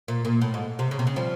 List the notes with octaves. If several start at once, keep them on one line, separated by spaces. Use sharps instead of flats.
A#2
A#2
A2
G#2
C3
C#3
C3
C#3
F3 G3